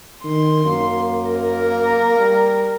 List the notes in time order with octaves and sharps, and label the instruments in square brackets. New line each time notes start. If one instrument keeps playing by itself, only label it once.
[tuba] D#3 [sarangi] C6
[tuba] F#2 [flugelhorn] A#3
[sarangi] A#4
[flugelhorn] G3